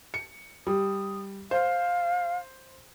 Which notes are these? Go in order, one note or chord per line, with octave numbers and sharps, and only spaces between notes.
C#7
G3 D#6
C5 F5